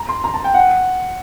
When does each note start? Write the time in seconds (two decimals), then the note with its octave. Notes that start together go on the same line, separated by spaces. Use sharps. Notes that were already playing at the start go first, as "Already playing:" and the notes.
Already playing: A#5
0.09 C6
0.24 A#5
0.34 A5
0.44 G5
0.54 F#5